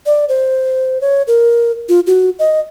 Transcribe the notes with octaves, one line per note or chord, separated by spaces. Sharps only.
D5
C5
C#5
A#4
F4
F#4
D#5